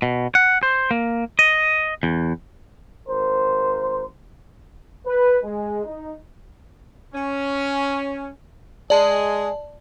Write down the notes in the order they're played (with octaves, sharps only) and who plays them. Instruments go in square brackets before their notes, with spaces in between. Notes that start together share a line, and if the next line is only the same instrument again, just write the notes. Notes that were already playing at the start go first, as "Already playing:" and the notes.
[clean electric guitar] B2
F#5
C5
A#3
D#5
E2
[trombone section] G#1 A#4 C5
[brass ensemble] B4
G#3
D#4
[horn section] C#4
[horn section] G#3 G#4 [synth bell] D5 A5